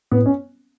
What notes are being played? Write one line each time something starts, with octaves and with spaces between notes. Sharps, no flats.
A2 B3
C#4